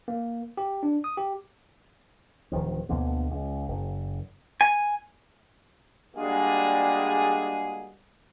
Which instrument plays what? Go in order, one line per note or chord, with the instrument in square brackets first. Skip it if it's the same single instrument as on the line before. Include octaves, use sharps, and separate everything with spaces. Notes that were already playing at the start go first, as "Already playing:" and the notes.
[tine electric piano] A#3
G4
D4
D#6
G4
[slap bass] D1 D#3 F3
D2 B2 D3 A#3
C#2
F#1
[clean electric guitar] G#5
[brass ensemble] G3 G#3 A#3 D4 F#4 G#4